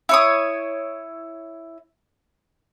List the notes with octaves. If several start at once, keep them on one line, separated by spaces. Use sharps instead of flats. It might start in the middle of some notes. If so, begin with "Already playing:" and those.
E4 C#5 D#6